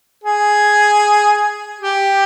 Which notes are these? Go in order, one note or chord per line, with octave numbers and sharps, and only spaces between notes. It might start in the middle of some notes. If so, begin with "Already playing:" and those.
G#4
G4